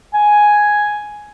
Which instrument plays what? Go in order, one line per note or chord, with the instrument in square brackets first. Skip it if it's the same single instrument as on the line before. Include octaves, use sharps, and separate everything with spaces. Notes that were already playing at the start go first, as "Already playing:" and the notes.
[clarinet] G#5